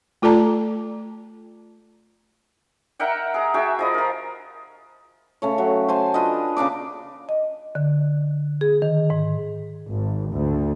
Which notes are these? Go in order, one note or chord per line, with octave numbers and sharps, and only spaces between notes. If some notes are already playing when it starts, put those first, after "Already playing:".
A3 F4 A4 D5 A5 A#5
A#4 E5 F#5 G5
G#4 A#5
F#4 G#4 E5 G5
F3 D#5 B5
F3 A#4
C#3 A3 C#5
F#3
C5 G#5 A5
D4 F4 B4 D#5
C#3 A#3 D4 D6
D#5
D3
G#4
D#3
G#2
G#1
D2